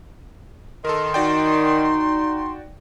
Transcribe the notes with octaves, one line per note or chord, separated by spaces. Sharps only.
D#3 A4 A#4 C6
D#4 F#4 D5 G5